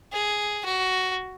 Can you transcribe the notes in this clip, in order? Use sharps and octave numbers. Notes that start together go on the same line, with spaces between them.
G#4
F#4